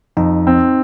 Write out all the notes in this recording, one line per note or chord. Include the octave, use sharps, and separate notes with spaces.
F2 D#4
C4